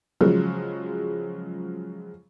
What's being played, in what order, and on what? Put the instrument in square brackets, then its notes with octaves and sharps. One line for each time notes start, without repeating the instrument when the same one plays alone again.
[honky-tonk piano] C#3 F3 F#3 G#3